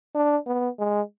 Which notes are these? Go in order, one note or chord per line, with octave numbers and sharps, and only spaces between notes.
D4
B3
G#3